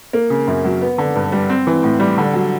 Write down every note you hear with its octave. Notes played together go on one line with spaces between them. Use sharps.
A#3
C#3
F#2
F#3
B3
D3
G2
G3
C4
E3
A2
G3
D3
F#3